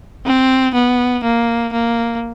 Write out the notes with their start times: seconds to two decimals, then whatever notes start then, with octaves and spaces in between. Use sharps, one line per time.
0.25 C4
0.75 B3
1.23 A#3
1.73 A#3